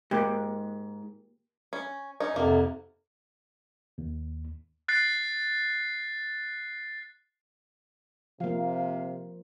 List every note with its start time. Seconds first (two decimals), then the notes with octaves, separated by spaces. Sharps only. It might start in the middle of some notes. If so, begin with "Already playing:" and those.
0.11 G#2 A#3 G4
1.73 C#4
2.20 C#4 D#4
2.36 F2 G#2 C3 A#3
3.98 D#2
4.88 F#6 A6 C7
8.40 C3 F3 A#3 F5